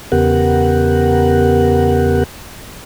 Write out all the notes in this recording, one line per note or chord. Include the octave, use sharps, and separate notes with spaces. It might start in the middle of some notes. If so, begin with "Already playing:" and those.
E2 C#3 B3 G4 A#4 F#5